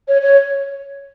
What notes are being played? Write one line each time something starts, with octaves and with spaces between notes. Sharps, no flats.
C#5
C#5